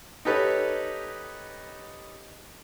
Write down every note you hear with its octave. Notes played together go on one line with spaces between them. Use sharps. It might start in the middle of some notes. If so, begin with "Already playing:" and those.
D#4 G4 A4 B4 C#5